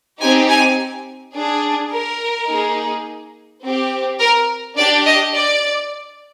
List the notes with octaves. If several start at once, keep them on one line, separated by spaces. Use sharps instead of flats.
C4 D#4 G4 G#5
G#5
D4 G#4
A#4
A#3 D#4 G#4
C4 G4
A#4
D4 G4 D5
D#5
D5